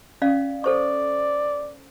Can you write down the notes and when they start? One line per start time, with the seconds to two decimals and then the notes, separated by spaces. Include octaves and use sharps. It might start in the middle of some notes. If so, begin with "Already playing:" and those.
0.22 C#4 D5 F5
0.64 A4 C5 D5 C#6